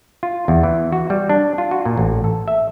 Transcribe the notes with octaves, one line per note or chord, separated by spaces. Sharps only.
F4
E2
E3
F#4
G3
D4
F4
F#4
A#2
A1
A4
E5